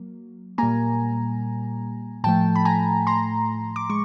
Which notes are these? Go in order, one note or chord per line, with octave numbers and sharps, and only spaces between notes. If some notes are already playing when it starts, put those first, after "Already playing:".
Already playing: F#3 A#3
A#2 G3 A#3 G#5 A#5
A2 F3 A3 G5 A5
B5
G#5 A#5
A#5 C6
D6
G#3 C#6